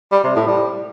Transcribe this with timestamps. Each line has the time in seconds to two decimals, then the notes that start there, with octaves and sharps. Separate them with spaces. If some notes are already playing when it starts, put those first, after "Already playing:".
0.12 G3
0.24 C3
0.36 A2
0.47 G3